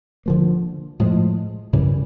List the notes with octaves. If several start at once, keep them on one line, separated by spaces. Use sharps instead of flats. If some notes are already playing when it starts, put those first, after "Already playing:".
D3 F3 A#3
A2 F3 G#3
F#2 C#3 E3 G3